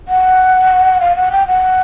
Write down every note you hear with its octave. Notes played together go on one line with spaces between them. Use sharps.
F#5
F5
F#5
G5
F#5